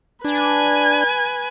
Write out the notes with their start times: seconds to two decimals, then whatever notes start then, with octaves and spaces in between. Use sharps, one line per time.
0.25 D4 B4 G#5